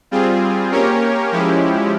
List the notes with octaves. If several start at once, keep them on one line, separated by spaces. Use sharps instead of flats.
G3 C4 F4 G#4
A#3 C#4 G4 A#4 C#5
F3 G#3 C#4 E4 G4